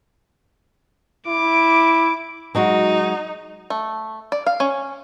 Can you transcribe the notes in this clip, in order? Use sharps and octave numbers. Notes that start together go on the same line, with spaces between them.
E4 D6
F#3 G#3 D#4 F#4
A3
D5
F5
C#4